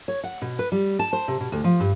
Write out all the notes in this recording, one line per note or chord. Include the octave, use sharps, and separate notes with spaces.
C#5
F#5
B2
B4
G3
A5
C5
C3
B2
D2
F3
G2